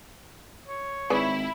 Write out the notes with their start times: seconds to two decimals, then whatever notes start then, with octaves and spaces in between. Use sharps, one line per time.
0.68 C#5
1.10 G#1 E4 G#4 B4 D5